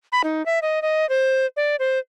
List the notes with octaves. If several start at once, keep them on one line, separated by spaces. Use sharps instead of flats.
B5
D#4
E5
D#5
D#5
C5
D5
C5